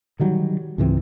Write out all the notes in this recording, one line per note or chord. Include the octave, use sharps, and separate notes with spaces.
D3 D#3 F#3 G3
C#2 G#2 E3 C4